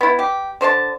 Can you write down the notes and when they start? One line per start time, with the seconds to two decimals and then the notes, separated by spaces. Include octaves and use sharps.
0.01 B3 E4
0.19 G4
0.61 D3 C5 C#5 A5